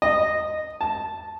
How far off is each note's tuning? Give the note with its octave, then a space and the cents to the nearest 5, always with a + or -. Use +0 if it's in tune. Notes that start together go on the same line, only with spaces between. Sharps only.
D#5 -10
A5 -5